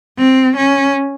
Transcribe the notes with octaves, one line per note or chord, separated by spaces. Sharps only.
C4
C#4